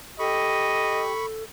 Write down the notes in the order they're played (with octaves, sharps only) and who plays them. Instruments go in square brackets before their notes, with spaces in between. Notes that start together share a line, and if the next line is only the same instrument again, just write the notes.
[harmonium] G4 [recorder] A4 [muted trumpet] D#5 [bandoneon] B5 C#6